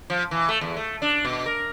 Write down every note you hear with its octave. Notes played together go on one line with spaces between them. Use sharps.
F3
E3
A3
E2
A3
D4
B2
A#4